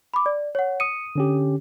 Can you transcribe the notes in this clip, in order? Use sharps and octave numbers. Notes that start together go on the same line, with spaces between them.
B5 D6
D5
C#5 F#5
D#6 C#7 D#7
D3 C#4 G4